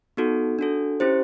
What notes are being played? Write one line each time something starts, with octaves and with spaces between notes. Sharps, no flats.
B3 D#4 F#4 A4
D4 F#4 A4
C#4 E4 G4 C5